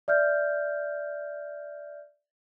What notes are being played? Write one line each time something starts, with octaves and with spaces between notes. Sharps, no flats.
D5 E5 F6 G6